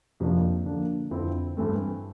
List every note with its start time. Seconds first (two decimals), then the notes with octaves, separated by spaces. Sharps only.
0.20 F2 C3 F3 A#3 D4
0.66 D3 F3 A#3 D4
1.11 F2 D3 F3 C4 E4
1.57 G2 E3 A3 C4